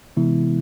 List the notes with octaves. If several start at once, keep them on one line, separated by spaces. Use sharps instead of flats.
C3 E3 G#3 B3 E4